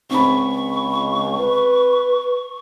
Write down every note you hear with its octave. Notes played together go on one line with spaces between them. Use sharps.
C#2 C4 B5 C#6
B4